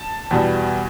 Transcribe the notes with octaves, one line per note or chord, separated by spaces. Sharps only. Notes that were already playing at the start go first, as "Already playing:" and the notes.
Already playing: A5
E2 B2 G3